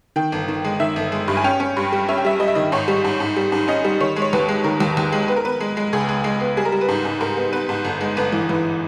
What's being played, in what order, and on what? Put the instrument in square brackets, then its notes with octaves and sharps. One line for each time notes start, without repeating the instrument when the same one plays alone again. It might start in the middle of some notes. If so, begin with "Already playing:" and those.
[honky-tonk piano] D#3 G5
G1
D#3
G#3
D#3 E5
G1
G#3
G2
G#5
C#4 G5
C#4
G2
G3
C#4 E5
G5
G3 E5
G3 D#5
E5
D#3 D#5
G#2 C#5
G3
G#2
G#2
G3
G#2
C#4 D#5
G3
D#3 C#5
G#3
C#5
D#2 B4
G#3
D#3 A#4
D#2
D#2
G#3
B3 B4
A#4
B3 B4
G#3
G#3
C#2 G#4
G#3
G#3
B3
G3 G#4
A#4
G3
B4
G#2
G#2
G#2 A#4
B3
B3 B4
G#2
G1
G#3
G1 B4
E3
E3